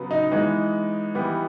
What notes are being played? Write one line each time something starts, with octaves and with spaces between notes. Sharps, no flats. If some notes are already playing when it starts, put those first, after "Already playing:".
Already playing: C#3 F#3 B3
D#4
E3 G#3 B3 D#4
E3 G3 B3